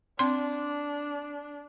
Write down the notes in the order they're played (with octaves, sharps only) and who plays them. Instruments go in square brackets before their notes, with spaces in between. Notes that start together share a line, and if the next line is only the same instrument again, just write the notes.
[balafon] C4 C6 [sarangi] D4